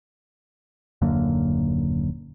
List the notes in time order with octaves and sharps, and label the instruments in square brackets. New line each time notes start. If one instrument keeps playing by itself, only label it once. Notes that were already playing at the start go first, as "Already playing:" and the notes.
[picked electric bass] D#1 F#2 D3 A#3